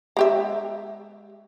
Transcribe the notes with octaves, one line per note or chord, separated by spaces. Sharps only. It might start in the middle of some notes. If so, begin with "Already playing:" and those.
G#3 G4 E5